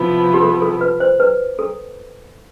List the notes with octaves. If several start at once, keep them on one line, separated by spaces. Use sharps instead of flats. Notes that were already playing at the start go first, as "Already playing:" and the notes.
Already playing: C3 F3 B3 E4
G4
A4
A4
B4
C5
B4
A4